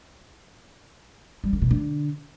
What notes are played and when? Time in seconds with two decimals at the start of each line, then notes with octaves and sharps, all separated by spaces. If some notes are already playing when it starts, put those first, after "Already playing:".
1.44 G3
1.53 D3
1.62 B2
1.71 D3